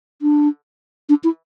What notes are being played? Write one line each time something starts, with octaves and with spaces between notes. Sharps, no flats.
D4
D4
E4